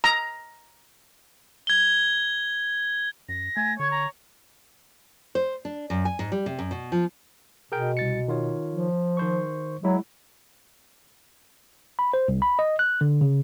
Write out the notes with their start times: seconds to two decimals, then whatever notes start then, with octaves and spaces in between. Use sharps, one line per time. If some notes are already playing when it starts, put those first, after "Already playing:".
0.04 A#5
1.67 G#6 G7
3.29 F#2 A#6
3.57 A3 G#5
3.79 D3 C#5 G#6
3.91 A#5
5.35 C5
5.65 D4
5.90 F#2
6.05 G#5
6.19 G#2
6.32 G3
6.46 C3
6.59 F#2
6.71 B2
6.92 F3
7.72 B2 G#4 A#4 G5
7.97 C2 A6 C#7
8.28 D#3 F4 C#5
8.71 F3
9.17 D#3 C5 C#6
9.83 F#3 G#3 E4
11.99 B5
12.13 C5
12.28 C2
12.42 B5
12.59 D#5
12.79 F#6
13.01 D3
13.21 C#3